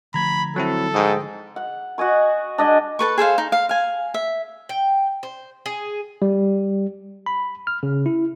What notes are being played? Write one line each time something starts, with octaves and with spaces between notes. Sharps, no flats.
D3 F3 A3 A#5 B5 G#6
F#3 C4 E4 A4
G#2 G5 D#6
F#5
F#4 D#5 G#5 C#6
D4 D#5 F#5 G#5
A4 B4 C#6
G#4 A4 C5 F5
D#4
F5
F5 G#5
E5
G5
C5
G#4
G3
B5
F6
C#3
E4